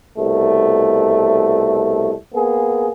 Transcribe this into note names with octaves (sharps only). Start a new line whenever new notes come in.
C2 B2 A3
A#3 B3 G#4